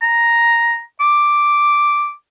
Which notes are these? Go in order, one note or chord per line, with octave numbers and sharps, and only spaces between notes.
A#5
D6